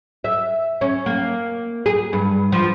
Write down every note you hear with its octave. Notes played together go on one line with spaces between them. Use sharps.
E5
C#4
A#3
G#4
G2
F3